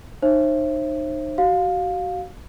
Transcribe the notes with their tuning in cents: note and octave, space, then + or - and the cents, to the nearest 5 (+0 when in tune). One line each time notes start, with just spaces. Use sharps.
D#4 -25 C5 +40 E5 +25
F#4 +30 F5 +15